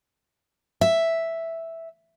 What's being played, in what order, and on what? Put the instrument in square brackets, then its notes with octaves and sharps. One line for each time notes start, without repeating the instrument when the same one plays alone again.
[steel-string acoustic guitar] E5